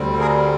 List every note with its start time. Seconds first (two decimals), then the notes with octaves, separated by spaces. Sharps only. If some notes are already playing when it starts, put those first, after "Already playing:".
Already playing: D2 D3 G3 C4
0.19 G#4 A#4